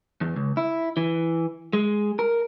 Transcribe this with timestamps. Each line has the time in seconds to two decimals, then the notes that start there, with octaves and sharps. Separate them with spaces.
0.21 E2
0.36 C#2
0.57 E4
0.97 E3
1.73 G#3
2.19 A#4